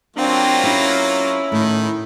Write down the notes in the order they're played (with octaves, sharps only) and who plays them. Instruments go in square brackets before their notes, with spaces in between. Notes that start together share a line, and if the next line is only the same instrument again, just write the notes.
[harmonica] F#3 A#3 F4 [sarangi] C4 [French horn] D4
[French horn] C#4 [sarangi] E4 [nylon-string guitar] G4
[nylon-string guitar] A2 [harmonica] D#3